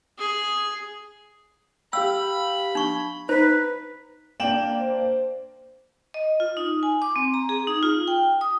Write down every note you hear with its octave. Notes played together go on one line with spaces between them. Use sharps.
G#4
G4 F5 G5 B5 E6
D4 C#6
D#4 B4 C5 A#5
A#3 D4 G5 E7 F#7
C5
D#5
F4
D#4
G#5
D6
C4
A#5
G#4
D#4
F4
G5
D#6